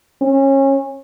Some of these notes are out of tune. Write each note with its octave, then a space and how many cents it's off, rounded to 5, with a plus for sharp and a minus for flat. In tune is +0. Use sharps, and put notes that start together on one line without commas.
C#4 -25